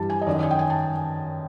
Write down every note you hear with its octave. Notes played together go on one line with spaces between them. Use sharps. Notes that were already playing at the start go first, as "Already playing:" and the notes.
Already playing: G2 E3 G3 A5
G#5
D#5
F#2 D#3 F#3 D5
D#5
G#5
G5
G#5
A5